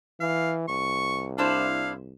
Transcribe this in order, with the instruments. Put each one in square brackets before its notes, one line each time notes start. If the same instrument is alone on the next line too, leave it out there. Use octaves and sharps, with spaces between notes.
[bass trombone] E3 [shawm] F5
[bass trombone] C2 [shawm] C#6
[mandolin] D4 E4 C5 [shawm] F5